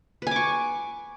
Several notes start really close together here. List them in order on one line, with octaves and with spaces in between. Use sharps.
B4 G#5 D6 C#6